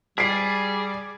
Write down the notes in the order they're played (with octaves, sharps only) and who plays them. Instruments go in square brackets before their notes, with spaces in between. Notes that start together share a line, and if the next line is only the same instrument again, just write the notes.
[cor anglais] G3 [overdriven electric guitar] G#4 [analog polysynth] D5 [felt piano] B6 C7